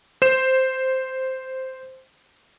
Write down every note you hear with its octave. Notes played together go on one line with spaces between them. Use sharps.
C5 E7